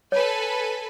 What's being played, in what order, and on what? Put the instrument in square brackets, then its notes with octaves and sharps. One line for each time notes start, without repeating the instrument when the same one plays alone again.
[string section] A4 B4 G#5 [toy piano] C#5